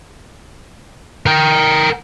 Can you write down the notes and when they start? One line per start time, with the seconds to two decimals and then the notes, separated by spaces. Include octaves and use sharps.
1.26 A#4 G5